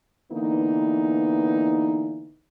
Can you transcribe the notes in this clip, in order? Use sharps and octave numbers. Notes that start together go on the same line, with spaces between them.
D3 E3 A#3 B3 D#4